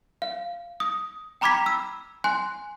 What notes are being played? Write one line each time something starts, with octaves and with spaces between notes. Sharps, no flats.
F5
D#6
G5 A#5 B5 D6 G#6 B6
E6
G#5 C6 F#6